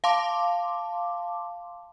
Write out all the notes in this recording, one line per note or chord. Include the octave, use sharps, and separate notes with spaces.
F5 A5 C6 D6